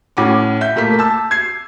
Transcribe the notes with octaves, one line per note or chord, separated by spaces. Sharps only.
A2 C#4 F#5 D6
E5 G6
A#2 A3 A#3 B6
A5 E6
G#6 C7